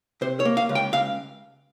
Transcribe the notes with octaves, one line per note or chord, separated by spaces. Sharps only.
C3 C5
C#5
A#3
F5
C#2
G5
C#2 F5